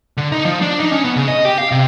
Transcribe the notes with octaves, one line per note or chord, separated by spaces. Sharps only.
D3
D#4
F3
D4
D#4
C#4
B3
C#3
D#5
G4
F5
C3